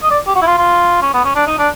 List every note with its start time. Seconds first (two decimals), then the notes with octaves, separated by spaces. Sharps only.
0.02 D#5
0.10 D5
0.27 G4
0.35 F#4
0.42 E4
0.46 F4
0.58 F4
1.02 C#4
1.14 B3
1.25 C#4
1.35 D4
1.47 D#4
1.58 D4